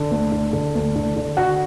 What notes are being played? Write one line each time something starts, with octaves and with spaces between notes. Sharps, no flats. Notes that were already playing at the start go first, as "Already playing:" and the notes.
Already playing: D3
D2
D3
D3
D2
D3
D3
D3 F#4 F#5